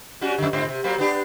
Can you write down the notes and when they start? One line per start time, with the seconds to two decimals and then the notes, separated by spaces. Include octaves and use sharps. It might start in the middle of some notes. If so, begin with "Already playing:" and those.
0.21 G3 C#4 F#4
0.38 F2 D3
0.53 G#2 D3 C4
0.68 C3
0.84 F#3 A#3 C4
0.98 B3 D4 G4